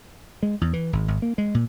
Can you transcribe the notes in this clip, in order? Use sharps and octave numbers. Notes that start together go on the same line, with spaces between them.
G#3
E2
E3
G#1
G#1
A#3
G#3
A#2